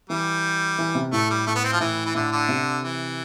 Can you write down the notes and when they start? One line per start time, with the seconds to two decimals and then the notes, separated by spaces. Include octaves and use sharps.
0.10 E3 G3
0.78 E3
0.95 C3
1.12 A2 A3
1.30 G3
1.47 A2 A3
1.55 B3
1.64 C4
1.72 F3
1.80 A2 E3
2.05 E3
2.15 A2 D3
2.32 D3
2.49 C3
2.84 E3